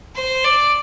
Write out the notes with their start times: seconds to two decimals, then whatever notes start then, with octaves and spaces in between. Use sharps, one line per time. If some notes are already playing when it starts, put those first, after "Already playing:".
0.16 C5
0.44 D5